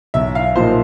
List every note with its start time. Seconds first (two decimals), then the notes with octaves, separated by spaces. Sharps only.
0.14 B1 E5
0.35 F5
0.56 A#2 F3 A#3 D#4 C5